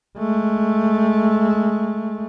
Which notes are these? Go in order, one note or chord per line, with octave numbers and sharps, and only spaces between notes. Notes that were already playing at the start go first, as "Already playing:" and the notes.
G#3 A3